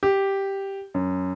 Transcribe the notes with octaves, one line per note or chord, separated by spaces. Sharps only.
G4
F#2